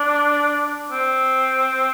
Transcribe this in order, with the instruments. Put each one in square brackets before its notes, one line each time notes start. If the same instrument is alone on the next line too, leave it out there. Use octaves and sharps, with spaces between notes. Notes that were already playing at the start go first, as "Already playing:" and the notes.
Already playing: [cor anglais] D4
C4